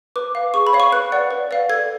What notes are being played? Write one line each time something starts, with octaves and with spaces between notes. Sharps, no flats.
B4 D6
F5
G#4 C#6
B5
C#5 F5
C#6
B4 F#6
D5 F#5
B4
D5 F5
A4 G#6